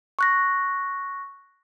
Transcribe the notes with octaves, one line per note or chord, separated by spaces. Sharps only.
C#6 F#6 A#6